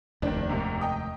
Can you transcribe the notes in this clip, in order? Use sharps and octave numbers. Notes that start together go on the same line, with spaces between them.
F1 D#2 D#3 D4
G#2 C3 A#3
D#5 G5 D#6